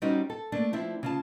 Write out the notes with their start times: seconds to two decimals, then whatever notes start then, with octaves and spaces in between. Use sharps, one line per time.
0.02 G3 C4 C#4 D#4 F#4 G4
0.30 A4
0.52 A3 A#3 D4
0.73 F3 C4 D4 E4
1.03 C#3 F4 A5